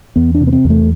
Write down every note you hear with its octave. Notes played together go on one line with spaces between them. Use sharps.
E2 B3
D4
C3
B3
C4
E2
A3